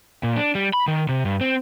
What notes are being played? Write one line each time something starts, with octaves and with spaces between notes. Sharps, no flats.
A#2
D4
G3
B5
D#3
C3
G2
C4